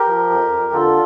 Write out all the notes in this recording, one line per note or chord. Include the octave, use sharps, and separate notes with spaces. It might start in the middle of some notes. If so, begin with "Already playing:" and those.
Already playing: G4 A#4
F3
F2
F2
D3 F4 A4